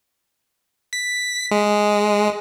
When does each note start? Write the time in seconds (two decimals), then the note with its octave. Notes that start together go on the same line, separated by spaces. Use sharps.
0.93 B6
1.51 G#3